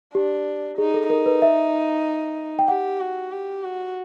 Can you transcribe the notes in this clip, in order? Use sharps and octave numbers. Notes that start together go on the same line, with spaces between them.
D4 G4
D#4 G#4
A4
D#4 A#4
B4
E5
G5
G4 F#5
F#4
G4
F#4